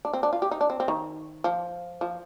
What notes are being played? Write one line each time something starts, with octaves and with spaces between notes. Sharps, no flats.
D4
C4
D4
F4
G4
D#4
D4
C4
C4
D#3
F3
F3